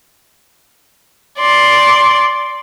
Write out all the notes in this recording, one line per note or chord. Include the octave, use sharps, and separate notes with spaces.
D5 C6